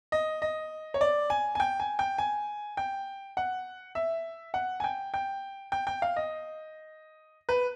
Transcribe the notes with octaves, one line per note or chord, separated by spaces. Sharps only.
D#5
D#5
C#5
D5
G#5
G#5
G5
G#5
G5
G#5
G5
F#5
E5
F#5
G#5
G5
G5
G5
G5
F5
D#5
B4